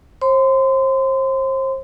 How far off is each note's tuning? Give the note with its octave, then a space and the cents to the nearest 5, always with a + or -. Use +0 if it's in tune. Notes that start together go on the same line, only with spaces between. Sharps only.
C5 +35 C6 -30